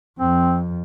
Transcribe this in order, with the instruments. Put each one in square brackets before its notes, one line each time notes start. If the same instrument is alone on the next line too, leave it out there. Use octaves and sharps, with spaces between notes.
[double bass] F2 [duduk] C4